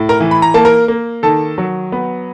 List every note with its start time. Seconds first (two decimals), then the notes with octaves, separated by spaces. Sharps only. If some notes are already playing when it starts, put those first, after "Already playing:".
Already playing: A2
0.09 A#4 A#5
0.20 E3
0.31 B5
0.42 A#5
0.54 A#3 A5
0.65 A#4 A#5
0.88 A#3
1.23 D#3 A4 A5
1.58 F#3
1.92 B3